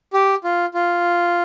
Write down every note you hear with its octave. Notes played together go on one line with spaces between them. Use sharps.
G4
F4
F4